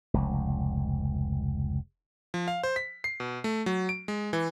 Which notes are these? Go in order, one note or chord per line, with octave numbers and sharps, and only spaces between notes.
F1 C#2
F3
F5
C5
B6
C7
B2
A3
F#3
D7
G#3
E3